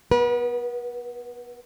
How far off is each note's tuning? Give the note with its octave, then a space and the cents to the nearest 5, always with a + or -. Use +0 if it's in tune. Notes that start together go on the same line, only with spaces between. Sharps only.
B3 -5 B4 -40